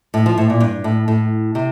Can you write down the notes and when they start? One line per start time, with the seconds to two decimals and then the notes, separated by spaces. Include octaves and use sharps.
0.14 A2
0.26 F3
0.37 A2
0.50 A#2
0.60 G2
0.84 A2
1.08 A2
1.55 C3